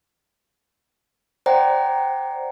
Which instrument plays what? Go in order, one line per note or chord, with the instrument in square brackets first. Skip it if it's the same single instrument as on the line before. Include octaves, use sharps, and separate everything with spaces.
[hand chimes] C5 D5 F#5 G5 A#5